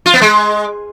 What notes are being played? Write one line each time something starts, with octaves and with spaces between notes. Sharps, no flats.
F4
B3
G#3